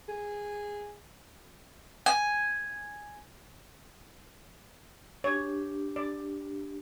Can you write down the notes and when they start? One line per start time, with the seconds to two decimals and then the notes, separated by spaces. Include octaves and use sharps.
0.09 G#4
2.06 G#5
5.24 D4 G4 C#5
5.96 D5